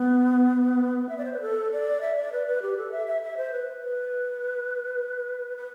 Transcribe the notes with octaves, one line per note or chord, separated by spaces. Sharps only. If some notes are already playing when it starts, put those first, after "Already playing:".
Already playing: B3
E5
D5
C5
B4
A4
D5
E5
D5
B4
B4
G4
A4
E5
E5
E5
C5
B4
B4
B4